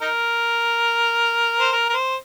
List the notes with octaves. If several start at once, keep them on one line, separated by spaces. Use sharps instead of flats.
D#4 A#4
C5
A#4
A#4
C5